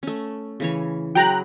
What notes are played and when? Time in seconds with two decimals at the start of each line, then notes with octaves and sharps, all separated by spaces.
0.03 A3 C#4
0.60 C#3 E3 C#5
1.15 F#3 G#4 B4 G5 A#5 F#6